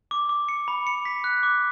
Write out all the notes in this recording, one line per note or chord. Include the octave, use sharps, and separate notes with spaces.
D6
D6
C#7
B5
C#7
B6
F#6
D6